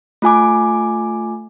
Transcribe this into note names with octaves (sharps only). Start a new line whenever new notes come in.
A3 F4 G#5 D6